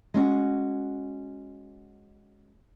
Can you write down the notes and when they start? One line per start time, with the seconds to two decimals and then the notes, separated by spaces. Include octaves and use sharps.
0.14 G#3 C#4 F#4